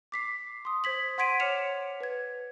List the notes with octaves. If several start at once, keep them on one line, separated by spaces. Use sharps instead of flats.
D6 B6 C7
C6 D#6
C5 G#6 B6 F#7
F#5 C6 G#6 B6 D7 D#7
C#5 D6 F6 C#7 E7 F7
B4 G#6